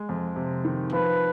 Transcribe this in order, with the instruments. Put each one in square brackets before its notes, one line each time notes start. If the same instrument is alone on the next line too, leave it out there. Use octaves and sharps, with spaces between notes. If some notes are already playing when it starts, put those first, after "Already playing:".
Already playing: [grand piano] G#3
F2
C3
D#3
[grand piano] F3 [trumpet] B4